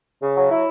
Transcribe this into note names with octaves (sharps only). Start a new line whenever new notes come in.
C#3
F#3
E4